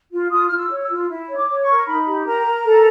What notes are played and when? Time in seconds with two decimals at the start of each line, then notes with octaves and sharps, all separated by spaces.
0.11 F4
0.30 F4 D#6
0.47 F4 F6
0.56 E6
0.70 C#5
0.83 E6
0.89 F4
1.09 E4
1.29 C#5
1.35 D6
1.48 C#5
1.61 C#6
1.68 A#4
1.86 D#4 B5
2.06 G4
2.26 A#4 A#5
2.46 A#4
2.65 A4